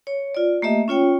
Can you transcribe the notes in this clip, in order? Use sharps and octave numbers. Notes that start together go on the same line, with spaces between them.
C#5
F4 D5
A3 A#3 G4 D#5 E5
C#4 F4 C#5 G5